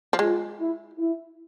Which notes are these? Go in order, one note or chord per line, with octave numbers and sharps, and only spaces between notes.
F3
G#3 F4
E4
E4